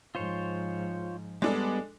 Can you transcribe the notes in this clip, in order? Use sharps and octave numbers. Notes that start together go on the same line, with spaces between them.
G#2 F3 F4 C5 C#5
G3 G#3 B3 D4 A4